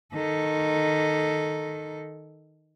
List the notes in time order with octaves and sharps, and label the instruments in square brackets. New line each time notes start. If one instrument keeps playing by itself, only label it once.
[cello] D#3 A4